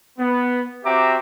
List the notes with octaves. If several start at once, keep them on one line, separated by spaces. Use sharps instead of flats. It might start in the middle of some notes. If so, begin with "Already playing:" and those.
B3
C4 F#4 G4 E5 A#5 D6